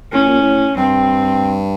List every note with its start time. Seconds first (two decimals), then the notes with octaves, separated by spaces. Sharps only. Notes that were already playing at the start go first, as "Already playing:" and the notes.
0.12 A2 C#4
0.26 A#2
0.39 A2
0.77 G2 C4